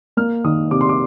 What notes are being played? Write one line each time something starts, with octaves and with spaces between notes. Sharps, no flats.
A#3 F6
D#3 D#6
C3 D6
C6
D6